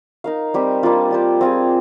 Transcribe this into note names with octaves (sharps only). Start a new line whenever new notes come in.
D#4 A#4 F5
G3 C4 G4
G3 A#3 D4 F4
D4 G4 C5
C4 F4 G#4